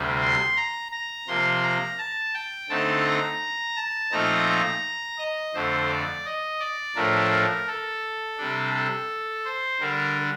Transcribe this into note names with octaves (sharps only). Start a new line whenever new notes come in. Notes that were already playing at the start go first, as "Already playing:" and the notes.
Already playing: D2 C3 G3
C6
A#5
A#5
C3 F3 A#3 C6
A#5
A5
G5
D3 A3 C4 D#4 A5
A#5
A5
A#2 F3 A3 C4 D#4 A#5
D#5
F2 D3 A3 C5
D5
D#5
D5
A2 F3 A3 D4 A#4
A#4
A4
C3 G3 D4
A4
C5
D3 G3 D4 A#4